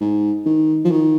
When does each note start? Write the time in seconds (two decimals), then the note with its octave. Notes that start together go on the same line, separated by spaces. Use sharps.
0.01 G#2
0.46 D#3
0.85 F3
0.91 D#3